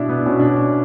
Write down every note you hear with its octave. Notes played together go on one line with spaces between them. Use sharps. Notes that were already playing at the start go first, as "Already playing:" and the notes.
Already playing: B2 D4 E4
B3
B2 C#4
D4
C#4